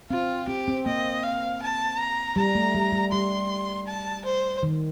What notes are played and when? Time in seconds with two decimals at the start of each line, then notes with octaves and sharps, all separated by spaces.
0.11 C4 F4
0.48 C4 G4
0.68 C4
0.86 A#3 D#5
1.24 F5
1.62 A5
1.99 A#5
2.36 G3 A#5
2.55 A3
2.75 G3
2.92 G3
3.12 G3 C6
3.87 A5
4.25 C5
4.63 D#3